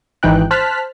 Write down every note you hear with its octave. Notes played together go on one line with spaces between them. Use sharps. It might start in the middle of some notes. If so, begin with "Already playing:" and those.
G#1 E3 D#4 G5 F#6
C5 A5 F6 F#6 B6